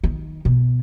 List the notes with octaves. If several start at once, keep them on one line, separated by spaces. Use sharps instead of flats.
D#3
B2